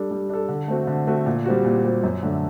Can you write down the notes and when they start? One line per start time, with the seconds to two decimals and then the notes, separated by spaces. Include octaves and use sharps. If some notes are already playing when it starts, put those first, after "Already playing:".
Already playing: G3 D4 A4
0.11 G3
0.29 D4 A4
0.48 D3
0.68 A3 C4 F#4
0.87 D3
1.07 A3 C4 F#4
1.26 A#2
1.46 G3 C4 F#4
1.64 A#2
1.84 G3 C4 F#4
2.03 F#2
2.23 D3 A3 D4